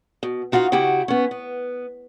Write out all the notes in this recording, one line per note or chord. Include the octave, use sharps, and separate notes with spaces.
B2
D#4 F4 F#4 D#5 F5
C#3 E4 F#4 G4 F#5
B3 C#4
B3